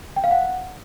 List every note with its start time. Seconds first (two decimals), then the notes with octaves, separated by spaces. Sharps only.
0.16 G5
0.24 F5
0.31 F#5